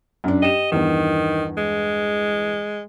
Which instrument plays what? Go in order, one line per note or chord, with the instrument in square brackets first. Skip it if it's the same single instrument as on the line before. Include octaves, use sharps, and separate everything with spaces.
[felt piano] F#2 D4
[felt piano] G4 E7 [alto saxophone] D#5
[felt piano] E2 G2 [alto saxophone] D#3
[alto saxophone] G#3